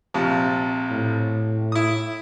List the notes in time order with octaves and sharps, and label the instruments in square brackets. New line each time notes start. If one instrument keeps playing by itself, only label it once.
[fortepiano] A#1 C3 F3
[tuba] A2
[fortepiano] E4 D#6